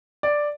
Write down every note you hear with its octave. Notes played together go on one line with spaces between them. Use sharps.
D5